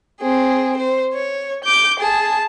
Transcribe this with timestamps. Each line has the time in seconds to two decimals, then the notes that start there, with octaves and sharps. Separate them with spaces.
0.21 C4 G#4
0.77 C5
1.14 C#5
1.65 D6 G6
2.00 G#4 A5